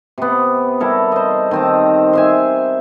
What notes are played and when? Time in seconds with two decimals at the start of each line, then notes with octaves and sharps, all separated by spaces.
0.18 C3 B3
0.80 G3 E4 A4 A#4
1.12 C5 D#5
1.51 D#3 C4 A5
2.13 C5 E5 G#5